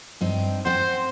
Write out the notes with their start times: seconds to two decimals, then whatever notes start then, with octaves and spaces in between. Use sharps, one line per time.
0.21 G2 C4 D#4
0.65 C4 C5 F#5